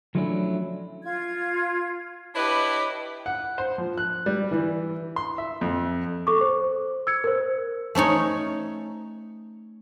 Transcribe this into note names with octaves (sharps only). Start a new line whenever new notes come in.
F3 F#3 A3 C#4 D4 E4
F4 G#6
D4 E4 G4 B4 C#5 D#5
F#5
C5
F3
F#6
G3
E3
C6
E5
F2
A4 C#6 D6
C5
E6 G#6 C#7
A#4 C5
A3 C#4 D#4 C#5